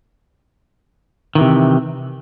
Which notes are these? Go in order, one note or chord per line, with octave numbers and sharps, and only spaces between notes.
C3 D#3 E3